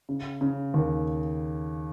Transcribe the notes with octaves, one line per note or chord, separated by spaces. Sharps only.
C#3
C#3
D#2